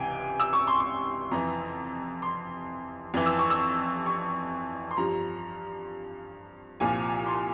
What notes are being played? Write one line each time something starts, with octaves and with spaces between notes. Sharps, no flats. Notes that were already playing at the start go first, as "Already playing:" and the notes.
Already playing: C#2 C3 E3 G5 G#5
E6
C#6
C6
C#6
F2 E3 A#5
C6
F2 E3
E6
C#6
E6
C#6
C6
G2 F3 A#5
C2 A#2 F3 G#5
C6